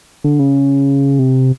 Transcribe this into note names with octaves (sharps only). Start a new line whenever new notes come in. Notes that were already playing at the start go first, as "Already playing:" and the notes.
D3
C#3
C3